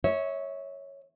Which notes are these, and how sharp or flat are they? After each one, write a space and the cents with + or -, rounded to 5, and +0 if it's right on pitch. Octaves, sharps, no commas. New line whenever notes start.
C#5 +0 E5 -30